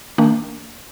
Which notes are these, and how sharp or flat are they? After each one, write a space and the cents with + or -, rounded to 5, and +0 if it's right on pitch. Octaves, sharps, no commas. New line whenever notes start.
D#3 +0 A#3 -35 D4 -20